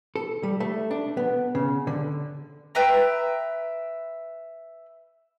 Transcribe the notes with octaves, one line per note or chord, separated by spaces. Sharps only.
A4
G3
A3
D4
B3
C#3
D3
B4 E5 G5 A#5